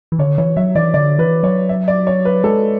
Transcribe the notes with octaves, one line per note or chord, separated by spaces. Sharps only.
E3
D3 C#5
E3 C#5
F#3 E5
E3 D5
D3 D5
E3 B4
F#3 C#5
E5
D5
C#5
B4
G#3 A4